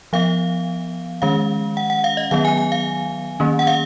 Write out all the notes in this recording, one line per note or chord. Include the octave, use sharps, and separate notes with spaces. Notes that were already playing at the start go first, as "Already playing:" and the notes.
F3 B3 F5
D#3 G#3 C#4 F5
F#5
F#5
F5
D#5
D#3 F#3 B3 F5
G#5
G#5
F5
D#3 A#3 C#4
F#5
F5